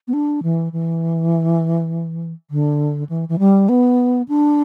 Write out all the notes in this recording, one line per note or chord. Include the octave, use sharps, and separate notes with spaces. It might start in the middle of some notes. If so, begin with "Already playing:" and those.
B3
D4
E3
E3
D3
E3
E3
G3
B3
D4